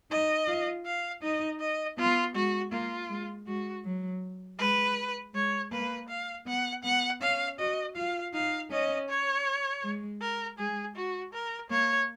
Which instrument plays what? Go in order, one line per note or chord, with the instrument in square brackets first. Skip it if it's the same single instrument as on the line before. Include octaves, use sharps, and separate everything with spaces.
[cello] D#4 [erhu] D#5
[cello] F4
[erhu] F5
[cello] D#4 [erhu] D#5
[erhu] D#5
[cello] B3 [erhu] F4
[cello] G#3 [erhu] F#4
[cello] A#3 [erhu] F4
[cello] G#3
[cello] G#3 [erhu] F#4
[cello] F#3
[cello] G#3 [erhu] B4
[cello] G#3 [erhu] C#5
[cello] A#3 [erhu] B4
[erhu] F5
[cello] B3 [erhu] F#5
[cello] B3 [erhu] F#5
[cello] C#4 [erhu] F5
[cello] F#4 [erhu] D#5
[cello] F4 [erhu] F5
[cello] D#4 [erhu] F5
[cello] C#4 [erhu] D#5
[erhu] C#5
[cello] G#3
[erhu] A#4
[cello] G#3 [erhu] G#4
[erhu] F#4
A#4
[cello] A#3 [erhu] C#5